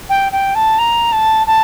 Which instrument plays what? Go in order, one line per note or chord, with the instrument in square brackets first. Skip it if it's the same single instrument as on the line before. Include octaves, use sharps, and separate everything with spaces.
[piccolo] G5
G5
A5
A#5
A5
A5